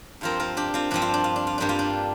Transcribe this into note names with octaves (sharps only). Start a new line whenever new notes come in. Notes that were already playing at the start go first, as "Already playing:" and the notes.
G2 F3 C4 F4 A#4
F4 A#4
D4 G4
C4 F4
G2 F3 C4 D4
F4
D4
F4
D4
F4
G2 G3 A#3 D4
F4
D4